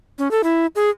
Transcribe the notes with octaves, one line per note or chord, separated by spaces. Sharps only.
C#4
A4
E4
G#4